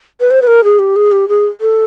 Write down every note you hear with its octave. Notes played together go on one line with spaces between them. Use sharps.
B4
C5
B4
A#4
G#4
G4
G#4
G4
G#4
A4